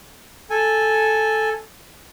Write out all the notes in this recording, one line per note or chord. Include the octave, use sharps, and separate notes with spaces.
A4 G#5